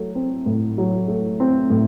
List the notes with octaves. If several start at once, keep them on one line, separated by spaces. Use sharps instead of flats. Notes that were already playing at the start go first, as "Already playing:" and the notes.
Already playing: F#3 A3
C4
A2
F#3
A3
C4
A2